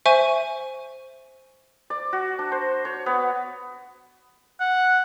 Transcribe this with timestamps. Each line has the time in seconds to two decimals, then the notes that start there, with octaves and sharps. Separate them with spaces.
0.06 C5 E5 G#5 C#6 D#7
1.90 D5
2.13 F#4
2.39 D4
2.52 C5
2.85 C#5
3.06 B3
4.60 F#5